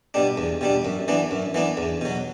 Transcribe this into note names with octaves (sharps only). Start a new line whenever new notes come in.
B2 G3 D4
E2
B2 G3 D4
F#2
E3 B3 D4
F#2
E3 B3 D4
E2
B2 F#3